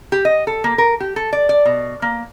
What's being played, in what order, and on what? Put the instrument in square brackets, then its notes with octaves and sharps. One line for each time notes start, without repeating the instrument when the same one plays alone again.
[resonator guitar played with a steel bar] G4
D#5
A4
A#3
A#4
G4
A4
D5
D5
B2
A#3